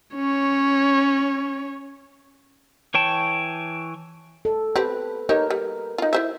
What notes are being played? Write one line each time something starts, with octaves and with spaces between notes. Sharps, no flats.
C#4 C#5
E3 C#5 G5 A5
A4
C4 G4 B4
D#4 G4 A#4 C#5
G3
D#4 F4
E4 C5 E5